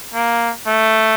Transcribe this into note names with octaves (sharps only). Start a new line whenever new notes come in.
A#3
A3